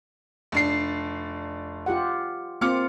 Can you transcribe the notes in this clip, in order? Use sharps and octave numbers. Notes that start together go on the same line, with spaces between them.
F1 D4 C7
F4 G4 F#5
A#3 C4 F4 D6 F6 C#7